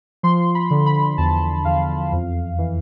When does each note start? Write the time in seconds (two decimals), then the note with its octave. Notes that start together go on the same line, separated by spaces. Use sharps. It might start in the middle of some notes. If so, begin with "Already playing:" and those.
0.23 F3 C6
0.55 B5
0.70 D3
0.86 B5
1.18 E2 A5
1.65 E2 F5
2.12 F2
2.59 E3